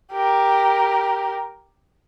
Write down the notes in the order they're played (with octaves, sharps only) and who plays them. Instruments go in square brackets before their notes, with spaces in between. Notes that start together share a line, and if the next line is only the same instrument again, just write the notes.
[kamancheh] G4 A#4